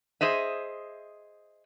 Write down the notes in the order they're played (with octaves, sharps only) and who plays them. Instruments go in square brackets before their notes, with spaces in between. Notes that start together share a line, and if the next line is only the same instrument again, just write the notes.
[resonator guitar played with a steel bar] G#4 C5 D#5 E5